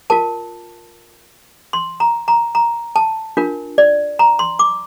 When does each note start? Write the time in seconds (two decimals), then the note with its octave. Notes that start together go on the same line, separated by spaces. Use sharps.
0.10 F4 A#4 A5
1.73 C6
2.00 A#5
2.28 A#5
2.55 A#5
2.96 A5
3.37 D4 F4 A#4
3.78 D5
4.19 A#5
4.39 C6
4.59 D6